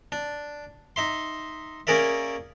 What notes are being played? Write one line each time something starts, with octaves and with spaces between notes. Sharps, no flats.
D4
D#4 E5 C6
A#3 C#4 G#4 A#4 D5 E5